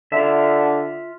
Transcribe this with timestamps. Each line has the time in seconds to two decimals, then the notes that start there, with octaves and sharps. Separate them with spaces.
0.12 D3 F4 E5